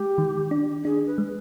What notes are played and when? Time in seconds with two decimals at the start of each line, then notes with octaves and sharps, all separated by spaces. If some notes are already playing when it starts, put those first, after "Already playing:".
Already playing: G#3 G4
0.18 D#3
0.51 D4
0.84 D4 G#4
1.06 B4
1.18 G#3